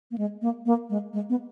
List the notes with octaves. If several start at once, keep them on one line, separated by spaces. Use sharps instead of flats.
A#3
G#3
A#3
A#3
G#3
G#3
B3